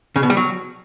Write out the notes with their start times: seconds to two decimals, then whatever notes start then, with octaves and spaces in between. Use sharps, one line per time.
0.16 C#3
0.23 B2
0.30 G3
0.37 F#3